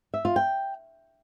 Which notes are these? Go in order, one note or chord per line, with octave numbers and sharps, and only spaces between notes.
E5
F4
G5